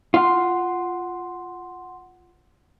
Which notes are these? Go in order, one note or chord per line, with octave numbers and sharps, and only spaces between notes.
F4 F#5 C6